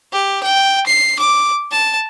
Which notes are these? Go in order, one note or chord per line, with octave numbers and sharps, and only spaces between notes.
G4
G5
C7
D6
A5